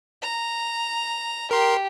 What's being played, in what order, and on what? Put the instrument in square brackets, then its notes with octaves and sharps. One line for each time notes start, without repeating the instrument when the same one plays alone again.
[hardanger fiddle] A#5
[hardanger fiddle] G4 [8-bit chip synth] A#4 C6